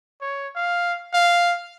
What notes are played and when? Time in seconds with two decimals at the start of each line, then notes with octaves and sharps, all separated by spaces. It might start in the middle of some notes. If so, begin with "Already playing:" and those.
0.21 C#5
0.55 F5
1.14 F5